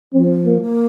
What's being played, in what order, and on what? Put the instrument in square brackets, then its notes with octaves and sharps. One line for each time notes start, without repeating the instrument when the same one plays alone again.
[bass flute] F3 [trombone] C4
[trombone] A#3
[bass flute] A#3